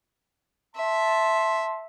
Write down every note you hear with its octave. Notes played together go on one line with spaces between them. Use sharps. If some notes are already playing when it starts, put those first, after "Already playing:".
E5 A5 C6